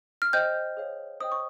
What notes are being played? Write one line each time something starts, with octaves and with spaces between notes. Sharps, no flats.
F6
C5 D#5 G5 G6
G#4 C#5 F5
C5 D#5 G5 D#6
C#6